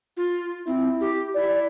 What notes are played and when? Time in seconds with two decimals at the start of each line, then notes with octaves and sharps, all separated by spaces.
0.17 F4
0.67 C4 E4
1.01 G4
1.35 E4 D5